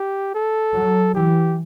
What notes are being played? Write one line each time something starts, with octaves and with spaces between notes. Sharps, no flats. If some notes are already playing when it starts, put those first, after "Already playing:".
Already playing: G4
A4
F#3
E3 G4